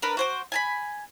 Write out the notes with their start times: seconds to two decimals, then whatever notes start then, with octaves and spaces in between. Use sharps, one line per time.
0.02 D4 A#4 B4
0.17 F#4 C5 D6
0.52 G#5 A5 B5